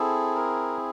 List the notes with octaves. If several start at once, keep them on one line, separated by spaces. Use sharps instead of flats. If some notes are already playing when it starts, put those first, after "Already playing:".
Already playing: C4 E4 G#4 A4
A#4